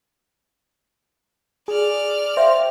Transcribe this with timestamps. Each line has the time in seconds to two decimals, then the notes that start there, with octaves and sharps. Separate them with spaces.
1.68 G#4 D5 F6
2.37 C5 E5 F5 G5